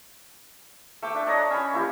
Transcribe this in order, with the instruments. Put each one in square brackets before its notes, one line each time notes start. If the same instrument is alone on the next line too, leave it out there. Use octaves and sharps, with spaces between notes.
[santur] A3 G5 D6
D4 E5
D4 C#5 D#5 A#5
C#4 G#5 B5
A#3 E4 G4